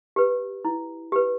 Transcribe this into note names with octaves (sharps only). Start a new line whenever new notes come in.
G4 B4
E4
G4 B4